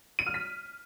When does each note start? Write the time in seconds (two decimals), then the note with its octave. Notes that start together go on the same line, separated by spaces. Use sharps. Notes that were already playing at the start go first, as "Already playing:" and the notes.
0.19 D#7
0.26 F6
0.34 B6